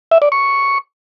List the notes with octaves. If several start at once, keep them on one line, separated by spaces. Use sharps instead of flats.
E5
D5
C#6